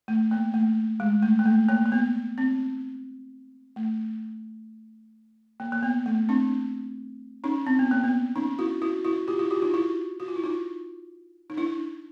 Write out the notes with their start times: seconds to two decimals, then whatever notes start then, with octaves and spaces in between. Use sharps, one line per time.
0.08 A3
0.31 A#3
0.54 A3
1.00 G#3
1.23 A3
1.39 A#3
1.46 A3
1.69 A#3
1.86 A#3
1.92 B3
2.38 C4
3.76 A3
5.60 A#3
5.72 A#3
5.83 B3
6.06 A3
6.29 C4 D4
7.44 C#4 D#4
7.67 C4
7.79 B3
7.91 A#3
8.04 B3
8.36 C#4 D#4
8.59 E4 F#4
8.82 E4 F#4
9.05 E4 F#4
9.28 F4 G4
9.39 E4 F#4
9.51 F4 G4
9.62 D#4 F4
9.74 E4 F#4
10.20 F#4
10.28 F4
10.36 E4
10.44 D#4 F4
11.50 D#4
11.57 D4 E4